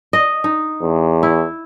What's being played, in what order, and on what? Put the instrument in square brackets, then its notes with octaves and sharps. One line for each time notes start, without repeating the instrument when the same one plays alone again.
[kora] D#5
D#4
[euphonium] E2
[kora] E4